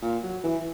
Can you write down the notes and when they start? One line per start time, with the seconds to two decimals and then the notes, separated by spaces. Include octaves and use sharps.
0.02 A#2
0.23 F#3
0.44 E3